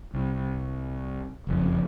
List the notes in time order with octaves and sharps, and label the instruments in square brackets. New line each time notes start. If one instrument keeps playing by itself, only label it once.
[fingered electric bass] C2
F#1 F2